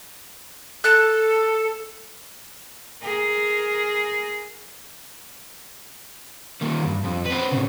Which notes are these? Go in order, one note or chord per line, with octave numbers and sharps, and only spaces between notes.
A4 F#6
G#4 A#4
A#2 D#3
D2 G2
F2
C4 B4
A2 C#3